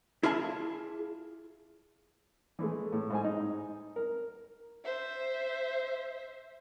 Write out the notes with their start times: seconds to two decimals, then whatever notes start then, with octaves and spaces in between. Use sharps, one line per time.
0.23 E4 F4 G#4 E5 A5
2.59 E3 G#3 A3
2.92 A2
3.10 G#2 C5 G#5
3.24 D#4
3.96 A#4
4.84 C5 E5